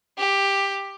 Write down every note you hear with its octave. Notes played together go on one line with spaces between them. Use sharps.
G4